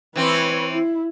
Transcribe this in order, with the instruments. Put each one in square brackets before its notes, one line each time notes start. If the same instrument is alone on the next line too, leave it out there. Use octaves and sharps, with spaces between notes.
[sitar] E3 C4 [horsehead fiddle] B4 C#5
[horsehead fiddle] E4